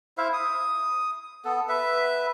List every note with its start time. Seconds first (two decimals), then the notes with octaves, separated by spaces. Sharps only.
0.18 E4 C5 E5 F5
0.33 D#6
1.45 B3 A4
1.69 B4 E5